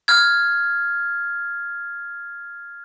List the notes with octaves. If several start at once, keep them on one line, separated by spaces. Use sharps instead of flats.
F6 G#6